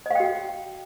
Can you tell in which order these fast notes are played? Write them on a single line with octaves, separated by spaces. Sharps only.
D#5 F5 G5 F#4